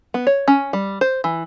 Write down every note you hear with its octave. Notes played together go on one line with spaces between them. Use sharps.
B3
C#5
C#4
G3
C5
E3